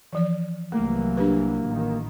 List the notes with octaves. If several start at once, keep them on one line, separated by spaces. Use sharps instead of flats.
E3 F3 D5
C2 E3 F#3 A3 A#3
D4 G4 B4
A1 D#3